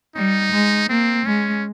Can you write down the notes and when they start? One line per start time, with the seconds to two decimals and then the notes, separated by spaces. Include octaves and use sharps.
0.16 G3 D#4
0.52 G#3
0.89 A#3 C4
1.26 G#3 C#4